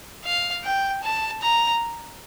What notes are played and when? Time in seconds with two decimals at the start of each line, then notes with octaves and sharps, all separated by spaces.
0.24 F5
0.64 G5
1.03 A5
1.42 A#5